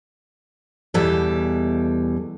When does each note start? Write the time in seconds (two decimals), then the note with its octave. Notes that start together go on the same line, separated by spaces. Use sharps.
0.94 E2 B2 E3 G3 A4